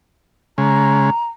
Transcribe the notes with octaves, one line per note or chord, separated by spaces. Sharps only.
C#3 G#3 A#5